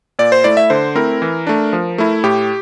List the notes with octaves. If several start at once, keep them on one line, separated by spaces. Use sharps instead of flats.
A#2 D5
C5
A3 E4 D5
E5
D3 C5
A3 C4 E4 A#4
E3
A3 D4
F3
A3 E4
A2 G4